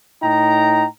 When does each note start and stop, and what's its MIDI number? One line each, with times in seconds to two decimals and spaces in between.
0.22 0.85 45
0.22 0.85 63
0.22 0.85 79
0.22 0.85 82